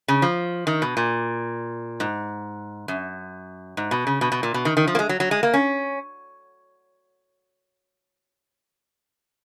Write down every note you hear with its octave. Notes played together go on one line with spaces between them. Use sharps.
C#3
F3
D#3
B2
A#2
G#2
F#2
G#2
B2
C#3
B2
B2
A#2
B2
D#3
D#3
F3
A#3
G#3
F#3
F#3
G#3
A#3
C#4